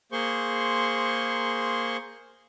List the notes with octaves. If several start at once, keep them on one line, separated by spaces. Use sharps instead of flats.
A#3 G#4 C5 C6 C#6